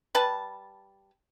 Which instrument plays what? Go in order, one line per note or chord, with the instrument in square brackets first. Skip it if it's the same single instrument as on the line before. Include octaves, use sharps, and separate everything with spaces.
[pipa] G3 B4 A5